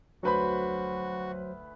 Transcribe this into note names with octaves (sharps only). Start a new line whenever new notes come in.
D2 F#3 F#4 B4 C5 B5